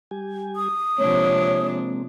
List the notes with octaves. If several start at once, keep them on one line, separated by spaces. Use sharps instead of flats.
G3 G4 G#5
D#6
C3 F3 G#3 A#3 C4 D4 C#5